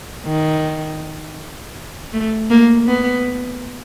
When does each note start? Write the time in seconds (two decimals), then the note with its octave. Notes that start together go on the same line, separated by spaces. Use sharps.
0.26 D#3
2.13 A3
2.50 A#3
2.87 B3